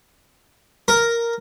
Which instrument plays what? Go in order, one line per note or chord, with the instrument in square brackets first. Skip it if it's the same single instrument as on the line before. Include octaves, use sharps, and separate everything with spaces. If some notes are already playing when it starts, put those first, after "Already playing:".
[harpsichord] A#4